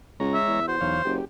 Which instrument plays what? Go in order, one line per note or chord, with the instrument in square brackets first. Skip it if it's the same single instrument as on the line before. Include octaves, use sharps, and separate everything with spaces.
[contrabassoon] C#2 [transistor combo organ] G#3 C#5 A#5
[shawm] E5
[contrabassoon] E2
[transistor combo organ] F#4 [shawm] C5
[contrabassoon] B1 [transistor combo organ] E2 C#5 F5
[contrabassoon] F#1 [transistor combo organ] G4